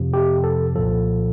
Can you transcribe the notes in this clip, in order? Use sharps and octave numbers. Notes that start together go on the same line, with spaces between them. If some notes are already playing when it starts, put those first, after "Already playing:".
Already playing: F2 C3 F3
G4
A4
C2 A#2 F3 A4